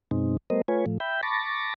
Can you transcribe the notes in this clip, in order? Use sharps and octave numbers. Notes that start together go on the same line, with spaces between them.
F#2 B2 G#3 C4 D#4
G3 A3 B3 A#4 C5 D#5
A3 F4 B4 C#5 G#5
A2 F3 A3
E5 G5 B5 G6
A5 B5 C#6 D6 A6 A#6